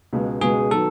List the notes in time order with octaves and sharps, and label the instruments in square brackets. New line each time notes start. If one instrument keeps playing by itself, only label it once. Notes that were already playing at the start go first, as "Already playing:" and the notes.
[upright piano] C#2 B2 G#3
[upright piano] C#2 B2 G#3 [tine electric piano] G#4
[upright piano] D#3 F#3 B3 [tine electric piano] A4